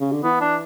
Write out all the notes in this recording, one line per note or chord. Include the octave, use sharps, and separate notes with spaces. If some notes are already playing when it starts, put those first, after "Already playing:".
C#3
D3
E3 B3
D4